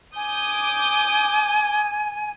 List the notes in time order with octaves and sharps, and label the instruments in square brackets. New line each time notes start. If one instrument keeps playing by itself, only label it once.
[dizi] G#5 [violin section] D6 D#6 G6